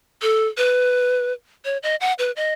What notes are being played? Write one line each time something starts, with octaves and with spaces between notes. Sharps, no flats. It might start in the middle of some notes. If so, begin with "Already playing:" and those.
A4
B4
C#5
D#5
F#5
B4
D#5